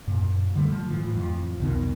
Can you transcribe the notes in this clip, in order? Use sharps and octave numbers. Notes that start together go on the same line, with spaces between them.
F#2 A#2
D3 G3 A3
F3
A2 E3 F3
F2 F3
C2 F2 B2 D#3